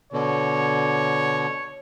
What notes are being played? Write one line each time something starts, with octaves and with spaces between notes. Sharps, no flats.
B2 D3 C#5